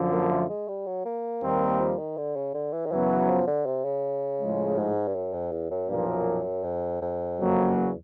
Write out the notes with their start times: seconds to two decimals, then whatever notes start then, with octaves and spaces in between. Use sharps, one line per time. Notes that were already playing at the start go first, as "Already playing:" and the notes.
Already playing: F#2 D3 F3
0.12 A#3
0.31 A3
0.49 G#3
0.68 G3
0.86 F#3
1.05 A#3
1.42 D#2 D#3 G3 C4
1.79 F3
1.98 D#3
2.17 D3
2.36 C#3
2.54 D3
2.73 E3
2.86 D#3
2.91 F#2 C#3 E3 F#3 B3
3.28 F3
3.47 D3
3.66 C3
3.84 C#3
4.41 A2 F3 G#3
4.78 G#2
5.08 G2
5.15 F#2
5.33 F2
5.52 E2
5.71 F#2
5.89 B1 G2 A#2 F3 A#3
6.08 F#2
6.64 F2
7.01 F2
7.38 F#2 C#3 F#3 A#3
7.76 E2